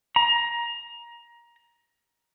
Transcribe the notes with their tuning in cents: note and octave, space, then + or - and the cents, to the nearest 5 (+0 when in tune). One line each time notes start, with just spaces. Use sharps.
A#5 +20